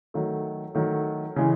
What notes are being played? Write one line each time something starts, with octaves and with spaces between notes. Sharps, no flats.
D#3 F#3 A3
D#3 F#3 A3
C#3 E3 G#3